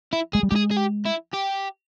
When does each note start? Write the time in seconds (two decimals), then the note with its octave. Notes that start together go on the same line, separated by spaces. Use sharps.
0.13 E4
0.33 G#3 G#4
0.43 G3
0.51 G#3 G4 G#4
0.71 G#4
0.77 G4
1.05 E4
1.33 G4